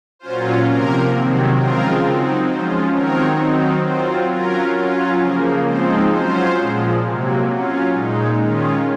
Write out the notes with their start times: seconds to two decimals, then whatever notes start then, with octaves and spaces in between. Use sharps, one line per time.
0.19 A#2 F#3 C#4 F4 C5
0.65 C3 F3 A#3 A#4
1.11 C3 D#3 F#3 C4
1.56 C#3 F3 G#3 C4 F4 A#4
2.01 F#3 C4 D#4
2.46 F3 G#3 C#4 F4 C5
2.92 D#3 F#3 C4 D#4 A#4 C#5
3.37 D#3 F#3 C4 D#4
3.83 F#3 C4 F4 C5
4.27 F#3 C#4 F4 A#4
4.74 F#3 C#4 F4
5.18 C#3 F3 A#3 A#4
5.63 F3 G#3 C4 D#4 C5
6.09 F#3 C#4 F4 C5
6.55 A#2 F3 G#3
7.00 C3 F#3 A#3
7.46 F#3 C#4 F4
7.90 A#2 G#3 D#4
8.36 D#3 G#3 C#4 F4